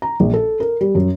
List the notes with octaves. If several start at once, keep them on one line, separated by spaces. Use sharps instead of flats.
A#5
A#1
A4
A#4
G3
F#2